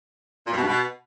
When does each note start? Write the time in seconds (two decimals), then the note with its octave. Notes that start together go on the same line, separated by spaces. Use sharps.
0.47 A#2
0.52 G2
0.57 B2
0.62 G2
0.67 B2